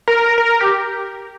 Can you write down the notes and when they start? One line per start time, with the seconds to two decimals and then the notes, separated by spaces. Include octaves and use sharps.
0.08 A#4
0.38 A#4
0.61 G4